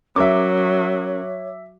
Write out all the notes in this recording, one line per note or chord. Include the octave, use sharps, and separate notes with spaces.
F#3 C#4 A#4 C#5 E5 D6